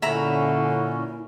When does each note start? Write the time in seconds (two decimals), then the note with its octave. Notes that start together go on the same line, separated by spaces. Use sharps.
0.02 A#2 D3 C#4 E4 E5 A#5 B5